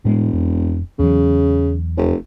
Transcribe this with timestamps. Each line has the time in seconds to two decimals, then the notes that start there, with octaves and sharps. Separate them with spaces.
0.05 E1 A2 G#3
0.33 F2
0.99 E2 C#3 E3 F#3
1.97 F1